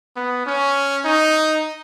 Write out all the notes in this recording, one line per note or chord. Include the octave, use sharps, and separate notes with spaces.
B3
C#4
D#4